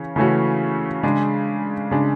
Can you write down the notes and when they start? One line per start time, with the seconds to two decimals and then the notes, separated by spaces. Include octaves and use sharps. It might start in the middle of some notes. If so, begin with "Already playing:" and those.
Already playing: C#3 E3 C#4
0.16 C#3 E3 A3 C#4 F#4
1.03 C#3 G#3 D4
1.91 C#3 G#3 D4